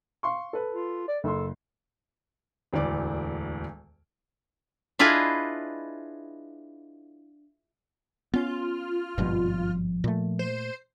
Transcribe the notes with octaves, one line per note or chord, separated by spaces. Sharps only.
F5 C6 C#6
A4 B4
F4
D5
F#1 A4 C6
E1 D2 A2 D5 D6
D4 E4 F4 G#4 B4 D#5
B3 C#4 F4
G#1 G2 B2 F3
A#2 A3
C5